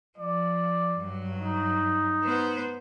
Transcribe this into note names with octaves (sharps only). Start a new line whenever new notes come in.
F3 D5
G2 F#3
D#4
B3 C5